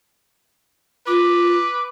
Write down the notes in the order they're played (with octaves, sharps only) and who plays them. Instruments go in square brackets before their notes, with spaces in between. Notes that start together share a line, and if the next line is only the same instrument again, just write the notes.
[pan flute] F4 [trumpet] B4 [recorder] D6